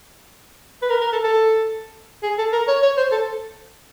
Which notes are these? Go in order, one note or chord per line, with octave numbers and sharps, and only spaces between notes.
B4
A#4
A#4
A4
A4
G#4
A4
A#4
C#5
C#5
C5
A4